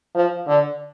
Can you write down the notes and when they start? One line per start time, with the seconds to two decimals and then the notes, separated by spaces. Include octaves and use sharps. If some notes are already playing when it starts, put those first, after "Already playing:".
0.15 F3
0.48 D3